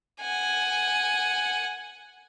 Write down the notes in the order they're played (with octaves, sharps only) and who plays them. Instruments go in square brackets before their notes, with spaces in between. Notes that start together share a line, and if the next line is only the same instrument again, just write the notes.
[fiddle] F#5 G#5